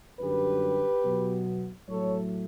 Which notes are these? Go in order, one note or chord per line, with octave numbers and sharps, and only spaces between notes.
F#2 D3 G3 G4 B4
B2 F#3 B3
A2 F#3 A3 A4 C#5